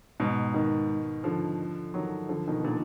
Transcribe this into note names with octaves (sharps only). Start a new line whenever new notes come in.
G#2 B2
B2 D#3
D3 F3
D#3 F#3
D3 F3
B2 D#3
A#2 D3